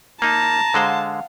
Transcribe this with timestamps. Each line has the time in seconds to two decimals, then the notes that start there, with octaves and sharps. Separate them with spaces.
0.22 A#3 D#4 A5 A#5
0.74 D3 G#3 C5 F5 F#5